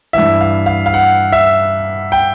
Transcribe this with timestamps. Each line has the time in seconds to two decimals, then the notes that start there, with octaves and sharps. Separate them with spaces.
0.13 G2 E3 E5
0.41 F5
0.66 F5
0.86 F5
0.94 F#5
1.32 E5
2.12 G5